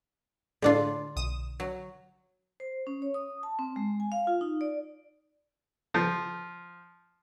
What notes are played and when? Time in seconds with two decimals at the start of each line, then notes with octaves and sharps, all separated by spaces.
0.62 A2 D3 G#3 D4 F4
1.16 B1 D#6 E7
1.60 F#3
2.60 C5
2.87 C#4
3.02 C#5
3.14 D#6
3.43 A5
3.59 C4
3.76 G#3
4.00 G#5
4.12 F5
4.27 F4
4.41 D#4
4.61 D5
5.94 F3